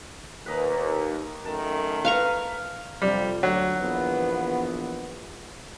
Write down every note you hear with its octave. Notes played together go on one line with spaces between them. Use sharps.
D#2 B4 D#5 A#5
F#2 D#3 A3 A5
B4 F5 A#5 C#6
F2 C3 G3
D2 F#3
A#1 E3 B3